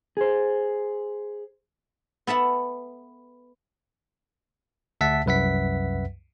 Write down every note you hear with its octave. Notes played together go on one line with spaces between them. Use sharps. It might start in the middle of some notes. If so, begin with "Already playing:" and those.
G#4 C5
B3 A4 E5 F#5
D2 E5 F#5 A5 B6
C2 F#2 B4 E5 F#5 B6